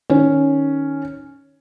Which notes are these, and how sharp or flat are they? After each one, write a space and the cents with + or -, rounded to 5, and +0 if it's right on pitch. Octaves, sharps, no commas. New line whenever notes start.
D#3 +0 C#4 +0